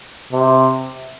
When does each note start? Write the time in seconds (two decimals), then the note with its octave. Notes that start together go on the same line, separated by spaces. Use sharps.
0.32 C3